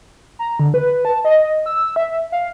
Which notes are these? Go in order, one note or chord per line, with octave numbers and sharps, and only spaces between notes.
A#5
D3
B4
A5
D#5
E6
E5
F5